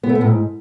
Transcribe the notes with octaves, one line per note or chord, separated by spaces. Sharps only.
B3
A3
B3
A2
G#2